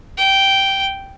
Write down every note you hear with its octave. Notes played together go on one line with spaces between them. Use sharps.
G5